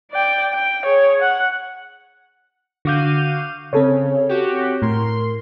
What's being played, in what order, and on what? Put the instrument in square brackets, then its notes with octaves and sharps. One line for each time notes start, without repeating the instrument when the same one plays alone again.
[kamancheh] D5 G5
G5
G#4 C#5
F#5
[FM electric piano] D3 D6 G6 [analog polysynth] F#4 F5 D#7
[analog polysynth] C#3 [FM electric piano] C4 A4 C#5
[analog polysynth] F#4 G4
[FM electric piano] A2 [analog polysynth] A#4 C6